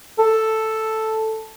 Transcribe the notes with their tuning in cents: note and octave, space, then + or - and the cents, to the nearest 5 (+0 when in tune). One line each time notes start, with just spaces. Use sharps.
A4 +0